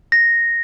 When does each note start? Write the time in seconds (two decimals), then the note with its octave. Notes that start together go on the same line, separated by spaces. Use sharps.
0.12 A#6